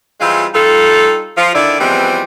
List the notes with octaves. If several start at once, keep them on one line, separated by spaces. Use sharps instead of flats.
E3 G3 G#3 C4 F4
G3 D#4 F4 A4
F3 F4
D3 D#3 E4 D5
E3 F3 G3 G#3 B3 C4